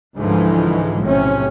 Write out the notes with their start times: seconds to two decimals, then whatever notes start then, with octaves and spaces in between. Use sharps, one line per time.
0.17 C#2 G#2 D3 E3 F3 G#3
1.00 B1 A2 C3 C#4